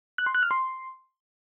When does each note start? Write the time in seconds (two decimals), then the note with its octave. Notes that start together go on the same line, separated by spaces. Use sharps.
0.18 F#6
0.26 C6
0.35 F#6
0.43 F6
0.51 C6